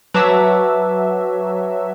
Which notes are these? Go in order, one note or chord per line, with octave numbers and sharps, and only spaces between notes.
F#3 B4 E5 A5 D6